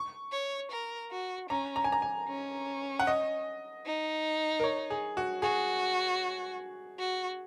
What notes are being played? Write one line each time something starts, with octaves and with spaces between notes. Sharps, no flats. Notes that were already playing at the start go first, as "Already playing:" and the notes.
Already playing: C#6
C#5
A#4
F#4
C#4 A#5
A#5
G#5
A#5
G#5
C#4
F#5
D#5
D#4
A#4
C#5
G#4
F#4
F#4 G#4
F#4